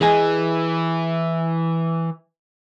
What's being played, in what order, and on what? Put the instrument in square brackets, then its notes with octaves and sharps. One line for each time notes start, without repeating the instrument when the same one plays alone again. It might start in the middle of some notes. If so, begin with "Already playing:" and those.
[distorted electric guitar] E3 [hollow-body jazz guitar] G#4 D#5 G#5